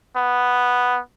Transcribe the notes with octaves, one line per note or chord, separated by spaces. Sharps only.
B3